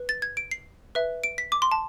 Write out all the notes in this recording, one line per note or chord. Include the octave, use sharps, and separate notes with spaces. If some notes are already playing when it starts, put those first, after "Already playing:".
Already playing: B4
A6
G#6
D7
C7
B4 E5
D7
B6
D6
C6
A5